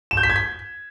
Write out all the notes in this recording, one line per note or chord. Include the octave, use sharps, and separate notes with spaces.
E7
G6
B6
G#6
B6